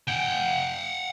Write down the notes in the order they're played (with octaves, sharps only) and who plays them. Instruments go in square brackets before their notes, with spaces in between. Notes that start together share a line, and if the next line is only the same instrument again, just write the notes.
[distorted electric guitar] F#5 G5